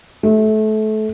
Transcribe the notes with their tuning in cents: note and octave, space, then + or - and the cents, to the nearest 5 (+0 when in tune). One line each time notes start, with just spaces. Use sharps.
A3 -25